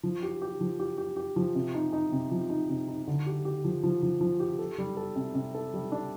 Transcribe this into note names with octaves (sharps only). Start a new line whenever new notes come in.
F3
G4
G4
F3
G4
G4
G4
F3
C3
D#4
D#4
C3
F3
D#4
C3
D#4
D3
G4
G4
F3
F3
F3
F3
G4
A4
G3
A4
C3
C3
A4
G3
D4